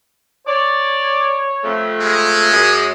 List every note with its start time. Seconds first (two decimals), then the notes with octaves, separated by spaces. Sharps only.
0.47 C#5 D5
1.64 F2 A3
2.01 G#3
2.51 F#2 G#4